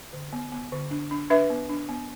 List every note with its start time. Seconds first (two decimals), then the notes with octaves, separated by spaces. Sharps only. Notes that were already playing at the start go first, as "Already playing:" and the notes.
0.13 D3
0.33 B3
0.52 B3
0.72 D3
0.91 D4
1.11 D4
1.30 D4 B4 E5
1.50 B3
1.70 D4
1.89 B3